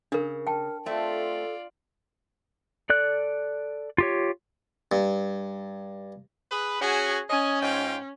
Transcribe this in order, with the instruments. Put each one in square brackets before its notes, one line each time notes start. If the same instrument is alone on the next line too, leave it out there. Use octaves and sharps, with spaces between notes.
[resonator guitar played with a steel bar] C#3 [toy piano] D4 A#4
[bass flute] A#4 [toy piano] G5 A5
[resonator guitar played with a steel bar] A3 C4 [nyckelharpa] F4 D5 [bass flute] A4
[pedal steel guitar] A4 D5 F#6
F4 G4 C#5
[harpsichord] G2
[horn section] G#4 B4
[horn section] C#4 F#4 [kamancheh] G#4 G#5
[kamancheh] C#4 [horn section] D#5 G#5
[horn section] G#2 F4 G5